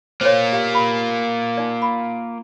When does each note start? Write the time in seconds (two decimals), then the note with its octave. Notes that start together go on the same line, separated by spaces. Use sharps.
0.21 A#3 F4 C5 C#5
0.52 G4 F5
0.73 G4 B5
1.57 D#4 D5
1.82 B5